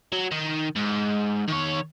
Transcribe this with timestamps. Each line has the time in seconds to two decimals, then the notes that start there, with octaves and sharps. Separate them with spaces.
0.12 F#3
0.31 D#3
0.76 G#2
1.48 D#3 C#5